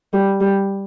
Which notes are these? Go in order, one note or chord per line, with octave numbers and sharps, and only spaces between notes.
G3
G3